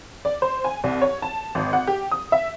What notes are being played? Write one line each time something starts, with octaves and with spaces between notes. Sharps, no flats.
D5
C5
G#5
C2
C#5
A5
G#1
F#5
G4
D#6
E5